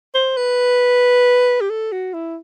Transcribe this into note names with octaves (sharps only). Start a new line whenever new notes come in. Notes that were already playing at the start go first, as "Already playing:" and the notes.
C5
B4
G4
A4
F#4
E4